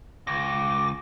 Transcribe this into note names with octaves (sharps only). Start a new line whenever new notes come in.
C#2 D6 A#6